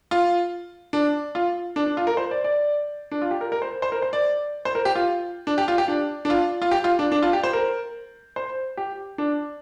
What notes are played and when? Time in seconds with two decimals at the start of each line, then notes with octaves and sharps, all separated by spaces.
0.11 F4
0.93 D4
1.35 F4
1.76 D4
1.86 D4
1.97 F4
2.07 A#4
2.17 C5
2.31 D5
2.44 D5
3.11 D4
3.22 F4
3.31 G4
3.41 A#4
3.52 A#4
3.62 C5
3.82 C5
3.92 A#4
4.02 C5
4.13 D5
4.65 C5
4.75 A#4
4.85 G4
4.95 F4
5.47 D4
5.58 G4
5.68 F4
5.78 G4
5.88 D4
6.25 D4
6.30 F4
6.62 F4
6.71 G4
6.84 F4
6.99 D4
7.12 D4
7.23 F4
7.33 G4
7.43 C5
7.53 A#4
8.36 C5
8.77 G4
9.18 D4